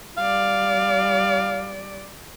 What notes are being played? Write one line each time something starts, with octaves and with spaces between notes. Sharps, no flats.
G3 D5 F5